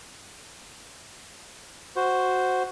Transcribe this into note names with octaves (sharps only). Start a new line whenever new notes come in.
F#4 C5